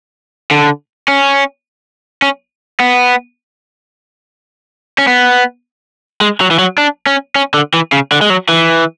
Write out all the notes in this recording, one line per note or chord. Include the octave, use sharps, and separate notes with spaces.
D3
C#4
C#4
B3
C#4
B3
G#3
F#3
E3
F#3
D4
C#4
C#4
D3
E3
C#3
D3
G#3
F#3
E3